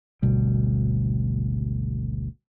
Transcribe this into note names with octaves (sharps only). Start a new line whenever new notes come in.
G#1 D2 B2 G3